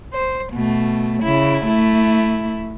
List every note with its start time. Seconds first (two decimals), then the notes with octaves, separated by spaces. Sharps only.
0.13 C5
0.53 B2 A3
1.23 C#3 E4
1.66 A3 E4